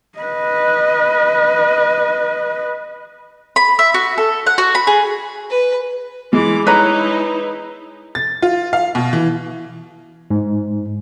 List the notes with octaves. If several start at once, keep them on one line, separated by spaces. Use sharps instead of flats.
B4 D#5
B5
E5
F#4
A4
F#5
F#4
B5
G#4
B4
E3 G#3 D6
D#4 E4 B4 C#5 A#5
A6
F4
F5
B2
E3
G#2